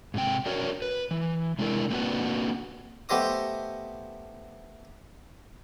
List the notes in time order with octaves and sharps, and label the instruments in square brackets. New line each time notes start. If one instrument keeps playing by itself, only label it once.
[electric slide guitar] G#2 C3 G5
D4 F#4 A#4 C#5
B4
E3
C3 G#3 A3 D4 E4 A#4
A#3 C4 D4 F#4 B4 F#5
[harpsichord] A3 B3 G4 C5 D#5 D#6